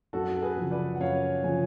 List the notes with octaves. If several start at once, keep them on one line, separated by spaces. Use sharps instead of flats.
F#2 F#4 A4
A4
G#4 B4
C#3 F3
B4 D5
F#5
F#2 C#5 F5
C#3 F3 G#5